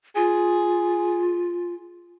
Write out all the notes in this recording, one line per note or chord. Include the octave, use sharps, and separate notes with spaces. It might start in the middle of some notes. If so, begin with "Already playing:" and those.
F4 G#4